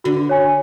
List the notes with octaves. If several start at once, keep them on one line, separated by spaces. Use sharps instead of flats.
D3 F#4
C#5 G#5